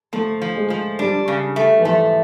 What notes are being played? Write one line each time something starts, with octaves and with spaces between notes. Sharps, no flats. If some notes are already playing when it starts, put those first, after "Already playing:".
F3 A3
F3
G#3
F3
G3 D4
C#3
A3
E3
F3 A3